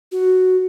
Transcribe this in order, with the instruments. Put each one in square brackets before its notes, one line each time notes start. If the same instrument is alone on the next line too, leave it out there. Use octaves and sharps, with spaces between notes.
[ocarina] F#4